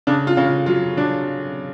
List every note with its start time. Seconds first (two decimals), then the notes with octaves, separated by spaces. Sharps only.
0.07 C#3 D4
0.27 F4
0.37 C#3
0.47 F4
0.66 F#3 F4
0.97 F#3 D4